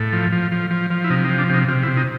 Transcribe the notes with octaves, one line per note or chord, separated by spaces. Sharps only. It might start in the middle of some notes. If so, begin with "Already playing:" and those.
Already playing: A2
F3
F3
F3
F3
F3
E4
C3 D#4
D#4
F3
D4
C3 D#4
C3 F4
E4
C3
D#4